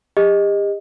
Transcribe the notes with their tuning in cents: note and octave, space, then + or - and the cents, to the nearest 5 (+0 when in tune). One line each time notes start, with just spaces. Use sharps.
G4 +40 D#5 +0